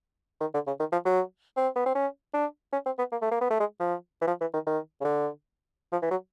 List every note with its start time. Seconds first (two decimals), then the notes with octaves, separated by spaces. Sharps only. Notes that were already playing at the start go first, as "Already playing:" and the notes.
0.41 D#3
0.54 D3
0.67 C#3
0.80 D#3
0.92 F3
1.05 F#3
1.56 C4
1.76 B3
1.86 C4
1.95 C#4
2.34 D4
2.73 C#4
2.86 C4
2.99 B3
3.12 A#3
3.22 A3
3.31 A#3
3.41 B3
3.50 A3
3.60 G#3
3.80 F3
4.21 E3
4.27 F3
4.41 E3
4.53 D#3
4.67 D#3
5.01 C#3
5.05 D3
5.92 F3
6.02 E3
6.11 F#3